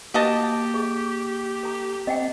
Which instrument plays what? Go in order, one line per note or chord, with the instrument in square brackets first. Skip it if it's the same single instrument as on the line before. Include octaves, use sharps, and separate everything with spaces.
[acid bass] A#3 [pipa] F#4 D#5 A5 [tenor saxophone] G4
[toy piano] G#4
A4 A#5
[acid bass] C4 [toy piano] D#5 F#5 G5